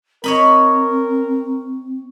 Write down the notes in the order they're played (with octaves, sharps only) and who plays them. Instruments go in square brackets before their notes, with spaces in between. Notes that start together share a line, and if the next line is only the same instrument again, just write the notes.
[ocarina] C4 [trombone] A#4 [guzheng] C#5 D#5 B5